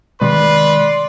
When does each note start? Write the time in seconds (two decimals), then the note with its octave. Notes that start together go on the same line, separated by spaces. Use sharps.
0.21 C3 D#3 G#3 B4 D5 C6